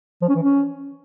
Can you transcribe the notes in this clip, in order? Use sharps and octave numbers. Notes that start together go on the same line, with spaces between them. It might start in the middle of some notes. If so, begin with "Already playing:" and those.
F3
C#4
E3
C#4